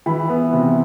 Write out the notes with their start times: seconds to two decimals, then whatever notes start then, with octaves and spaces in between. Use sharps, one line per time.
0.06 E3 B5
0.29 B3
0.53 C3